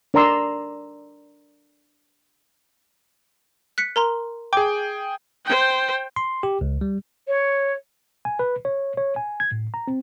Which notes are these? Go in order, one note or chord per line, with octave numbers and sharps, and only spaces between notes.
D4 A#4 D5 A#5 C6 E6
F#6 B6 C#7
A#4 A#5 C6
G#4 G5 D6
C5 G5
C6
G4
C#2
G3
C#5
G#5
B4
C#5
C#5
G#5
G#6
A2
A#5
C4